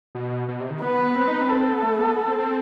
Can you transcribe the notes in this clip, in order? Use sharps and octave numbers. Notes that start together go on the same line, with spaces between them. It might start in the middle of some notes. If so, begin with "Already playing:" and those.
B2
B2
C3
D#3
B3 B4
C4
D#4
C4
A4
B3
A3
B3
B3
C4
C4